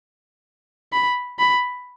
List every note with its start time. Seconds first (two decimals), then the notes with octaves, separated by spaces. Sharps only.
0.93 B5
1.39 B5